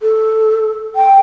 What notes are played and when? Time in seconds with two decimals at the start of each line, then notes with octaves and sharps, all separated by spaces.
0.01 A4
0.96 G5